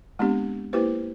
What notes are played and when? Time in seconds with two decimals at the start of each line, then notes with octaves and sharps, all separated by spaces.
0.19 G#3 B3 C4 D4 G4
0.73 A#3 E4 G4 B4 C5